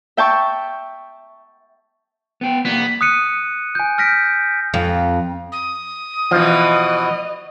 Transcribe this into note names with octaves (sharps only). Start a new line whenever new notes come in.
E5 G5 A5 C#6
B3 G5
C2 A#3 B3
D#6 F#6 C#7 D#7
G#5 G6
F6 G6 A#6 B6 D7
F2
D#6
B2 E3 F3 D#5